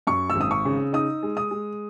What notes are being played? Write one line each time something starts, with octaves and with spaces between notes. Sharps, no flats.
F#2 C#6
E6
G#1
D#6
C#6
C#3
D#4 D#6
G#3
D#6
G#3